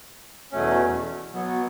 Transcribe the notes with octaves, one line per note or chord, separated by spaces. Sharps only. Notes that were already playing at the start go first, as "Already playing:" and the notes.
E2 B2 F#3 A3 C#4
B2 F#3 B3